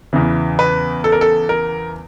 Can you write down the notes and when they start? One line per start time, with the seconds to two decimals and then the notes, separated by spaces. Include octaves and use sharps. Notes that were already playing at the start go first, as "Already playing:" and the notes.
0.13 E2 C#3 E3
0.59 B4
1.04 A4
1.12 A#4
1.21 A4
1.49 A#4